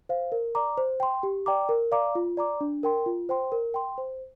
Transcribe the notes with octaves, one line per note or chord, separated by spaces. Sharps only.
C5 F5
A#4
D5 A#5 D6
C5
G5 C6
G4
D5 G5 A#5 D6
A#4
D5 F5 A#5 D6
F4
D5 A#5 D6
D4
A#4 G5 C6
F4
C5 G5 C6
A#4
G5 C6
C5